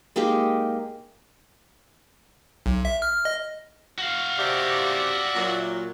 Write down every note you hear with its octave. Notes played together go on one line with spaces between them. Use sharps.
G#3 A#3 D#4 G4
B1
E5
F6
D#5
F#4 F5
C3 G4 D5 E5
A#2 F#3